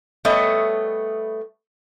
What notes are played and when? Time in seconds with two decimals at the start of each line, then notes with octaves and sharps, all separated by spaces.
0.25 G3 A3 B3 C#5 D#5 E5